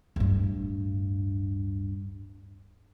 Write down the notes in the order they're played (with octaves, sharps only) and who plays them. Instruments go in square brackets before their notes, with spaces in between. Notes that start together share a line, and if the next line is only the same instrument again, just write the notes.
[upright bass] D1 G2